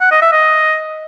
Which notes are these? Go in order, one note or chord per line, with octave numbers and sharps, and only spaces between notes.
F#5
D#5
E5
D#5